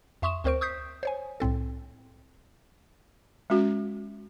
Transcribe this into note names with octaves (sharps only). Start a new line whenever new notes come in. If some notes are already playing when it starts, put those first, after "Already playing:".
F2 E5 C6 C#6 D#6 E7
D2 C4 A#4 C5 C#6 D7
C#6 D#6 G6 B6 C7
C5 C#5 G#5
C2 A2 C4 A4
G#3 C#4 F#4